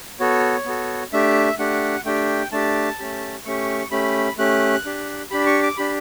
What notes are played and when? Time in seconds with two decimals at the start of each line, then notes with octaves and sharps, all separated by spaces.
0.20 B3 F#4 A4 C#5
0.65 B3 F#4 A4
1.13 A3 D4 G4 E5
1.58 A3 D4 G4 F#5
2.05 A3 D4 G4 G5
2.52 A3 D4 G4 A5
2.99 A3 C#4 G4
3.45 A3 C#4 G4 C#6
3.91 A3 C#4 G4 B5
4.38 A3 C#4 G4 F#6
4.85 D4 G4
5.31 D4 G4 B5
5.46 C#6
5.63 D6
5.77 D4 G4 B5